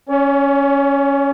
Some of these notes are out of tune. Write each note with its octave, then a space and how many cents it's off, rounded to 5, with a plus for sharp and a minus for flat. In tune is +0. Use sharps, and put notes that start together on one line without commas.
C#4 +0 C#5 +45